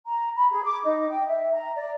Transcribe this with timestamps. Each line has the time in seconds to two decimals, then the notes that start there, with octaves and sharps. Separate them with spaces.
0.07 A#5
0.36 B5
0.51 G#4
0.64 D6
0.84 D#4
1.10 G5
1.28 E5
1.53 A#5
1.75 D5